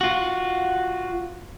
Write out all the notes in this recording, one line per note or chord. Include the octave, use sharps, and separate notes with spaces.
F4 F#4